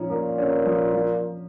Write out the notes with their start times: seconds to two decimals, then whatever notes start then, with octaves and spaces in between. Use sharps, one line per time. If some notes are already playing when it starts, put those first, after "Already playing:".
Already playing: F3 C#4 D#4
0.10 A#2 A#3
0.38 C#4
0.65 F3
0.94 F3